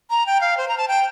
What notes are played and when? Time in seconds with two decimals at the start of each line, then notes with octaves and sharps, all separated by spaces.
0.10 A#5
0.26 G5
0.41 F5
0.57 C5
0.68 A#5
0.78 A5
0.88 G5